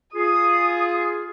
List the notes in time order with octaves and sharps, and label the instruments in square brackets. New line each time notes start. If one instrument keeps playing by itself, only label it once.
[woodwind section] F4 G#4 [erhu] D#6